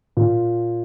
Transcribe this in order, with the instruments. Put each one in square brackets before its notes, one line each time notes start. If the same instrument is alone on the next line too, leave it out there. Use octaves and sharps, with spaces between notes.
[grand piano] A#2